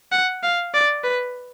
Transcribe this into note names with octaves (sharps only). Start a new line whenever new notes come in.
F#5
F5
D5
B4